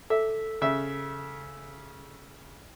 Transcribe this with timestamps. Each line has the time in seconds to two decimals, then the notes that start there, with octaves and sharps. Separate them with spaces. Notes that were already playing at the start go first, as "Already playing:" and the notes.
0.10 A4 E5
0.61 C#3 E5